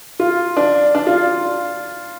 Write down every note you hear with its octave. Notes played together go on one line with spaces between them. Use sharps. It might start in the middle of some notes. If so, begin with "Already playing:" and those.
F4
D4
D4
F4